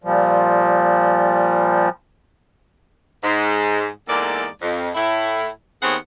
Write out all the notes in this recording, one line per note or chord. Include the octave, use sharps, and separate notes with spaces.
A#2 F3 G3
G#2
E2 G#2 A#3 A4 D5
F2
A2 E4
D#2 B3 C4 G#4 C#5 F#5